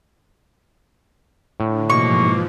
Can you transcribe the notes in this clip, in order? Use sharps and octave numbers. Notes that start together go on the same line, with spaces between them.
A2 D3
G#2 B2 E3 F3 A#3 C#6